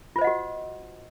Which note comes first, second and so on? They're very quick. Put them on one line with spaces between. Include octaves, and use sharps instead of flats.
F4 C5 D#5 F#5 F#4